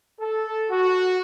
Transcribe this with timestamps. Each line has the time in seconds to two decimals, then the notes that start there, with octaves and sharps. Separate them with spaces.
0.19 A4
0.70 F#4